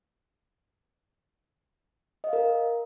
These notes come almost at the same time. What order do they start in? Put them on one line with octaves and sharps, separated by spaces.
D#5 F5 A#4